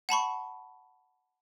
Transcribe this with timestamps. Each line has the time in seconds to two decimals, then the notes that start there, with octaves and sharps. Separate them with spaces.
0.09 F#5 A5 B5 C#6